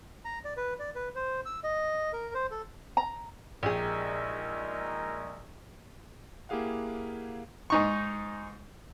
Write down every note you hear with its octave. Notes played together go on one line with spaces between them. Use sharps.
A#5
D5
B4
D5
B4
C5
E6
D#5
A#4
C5
A4
A#5
A#1 G#3 D#4 G4 G#4 A#4
A#3 E4 G4 G#4 F5 F#5
G#2 D#4 C#6